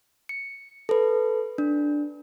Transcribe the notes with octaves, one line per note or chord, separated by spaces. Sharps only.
C#7
A4 B4
D4